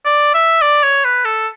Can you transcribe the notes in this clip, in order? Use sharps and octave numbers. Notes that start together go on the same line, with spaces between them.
D5
E5
D5
C#5
B4
A4